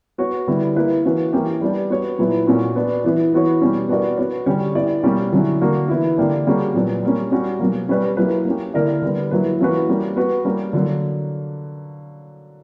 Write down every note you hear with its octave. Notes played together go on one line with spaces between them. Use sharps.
B3 F#4 C#5
D3 G3 B3 E4
A#3 E4 B4
E3 A#3 C#4 F#4 B4
E3 A#3 C#4 G4
G3 B3 D4
B3 F#4 C#5
A#2 F#3 B3 E4 B4
A#2 A#3 C#4 F#4
B3 D4 F#4
E3 B3 E4 B4
E3 B3 F#4 C#5
B2 G3 C#4
B3 D4 F#4 A#4 D5
B3 F#4 C#5
D3 G3 C#4 G4 C#5
B3 E4 B4 D5
B2 G3 A#3 C#4
D3 F#3 C#4 E4
D3 A#3 D4 F#4 A#4
E3 B3 E4
D3 A#3 D4 G4
C#3 G3 A#3 C#4 F#4
A#2 F#3 B3 D4
G3 A#3 C#4
G3 C#4 F#4
B2 F#3 A#3
G3 C#4 G4 B4 D5
F#3 A#3 E4 B4
A#3 C#4 G4
D3 A#3 E4 A#4 D5
D3 G3 B3
F#3 A#3 E4 B4
E3 A#3 C#4 F#4 B4
G3 A#3 C#4
B3 F#4 B4
G3 A#3 C#4 G4 A#4
D3 F#3 A#3